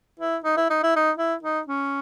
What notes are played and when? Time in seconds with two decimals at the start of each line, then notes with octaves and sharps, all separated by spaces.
0.20 E4
0.44 D#4
0.57 E4
0.71 D#4
0.84 E4
0.96 D#4
1.17 E4
1.43 D#4
1.67 C#4